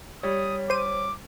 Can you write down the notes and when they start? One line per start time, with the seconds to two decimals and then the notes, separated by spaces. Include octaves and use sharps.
0.23 G3 C#5 D#6
0.70 C5 D6 D#7